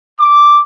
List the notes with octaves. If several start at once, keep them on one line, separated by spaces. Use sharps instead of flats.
D6